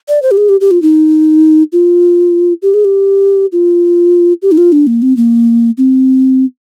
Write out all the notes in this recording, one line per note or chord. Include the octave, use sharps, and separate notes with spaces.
D5
C5
G4
G#4
G4
G4
F4
D#4
F4
G4
G#4
G4
F4
G4
D#4
F4
D4
A#3
C4
A#3
C4